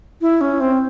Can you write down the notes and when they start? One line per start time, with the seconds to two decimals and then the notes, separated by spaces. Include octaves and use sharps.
0.21 E4
0.41 C#4
0.60 C4